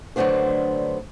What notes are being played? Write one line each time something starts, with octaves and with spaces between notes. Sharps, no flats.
D3 F#3 A3 B3 D4 C5